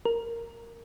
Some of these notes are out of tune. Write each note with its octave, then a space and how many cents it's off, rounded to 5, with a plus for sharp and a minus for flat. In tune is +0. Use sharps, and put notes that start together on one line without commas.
A#4 -10